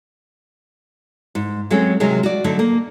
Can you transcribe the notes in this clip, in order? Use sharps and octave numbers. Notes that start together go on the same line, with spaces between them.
G#2
F#3 G#3 A3 C4 C#4 G#4
C3 D#3 F#3 G#3 G#4 A#4
F#4 D5
D3 F#3 A3 D#4
A#3